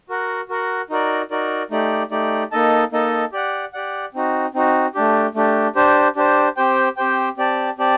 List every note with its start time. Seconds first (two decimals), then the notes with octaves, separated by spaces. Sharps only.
0.09 F#4 A#4 F#5
0.49 F#4 A#4 F#5
0.90 D#4 F#4 A#4 D5
1.31 D#4 F#4 A#4 D5
1.71 A3 D#4 G4 D5
2.11 A3 D#4 G4 D5
2.52 A#3 D#4 A4 D#5 A5
2.92 A#3 D#4 A4 D#5 A5
3.32 G4 D5 F#5
3.73 G4 D5 F#5
4.14 C4 D#4 F#4
4.54 C4 D#4 F#4
4.95 A3 D4 G4
5.35 A3 D4 G4
5.75 D4 G4 C5
6.16 D4 G4 C5
6.57 C4 G4 C5 G5
6.97 C4 G4 C5 G5
7.37 C4 G4 D5 A5
7.78 C4 G4 D5 A5